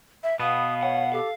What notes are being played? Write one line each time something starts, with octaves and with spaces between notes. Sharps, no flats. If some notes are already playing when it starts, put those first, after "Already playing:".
E5
B2 B3 F5 D#6
C#5 F#5
G4 A4 F5